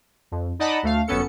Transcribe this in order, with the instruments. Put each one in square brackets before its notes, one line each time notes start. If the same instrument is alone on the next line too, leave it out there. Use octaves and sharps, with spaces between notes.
[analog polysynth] F2
D#4 D5 D#5 F#5 A5 B5
D2 A3 F5
G1 F#2 B3 C#4 A4 C#7